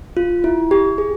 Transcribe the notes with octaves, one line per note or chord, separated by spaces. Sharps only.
F4
E4
G4
G#4